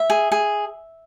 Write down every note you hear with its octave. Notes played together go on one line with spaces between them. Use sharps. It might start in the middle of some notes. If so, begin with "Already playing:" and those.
Already playing: E5
G#4
G#4